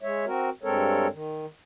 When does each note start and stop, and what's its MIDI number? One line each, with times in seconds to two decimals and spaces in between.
0.02 0.25 56
0.02 0.25 73
0.02 0.25 76
0.26 0.50 60
0.26 0.50 66
0.26 0.50 70
0.63 1.07 43
0.63 1.07 56
0.63 1.07 60
0.63 1.07 69
0.63 1.07 70
0.63 1.07 73
1.12 1.46 51